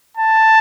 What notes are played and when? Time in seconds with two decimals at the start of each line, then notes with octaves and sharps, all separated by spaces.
0.17 A5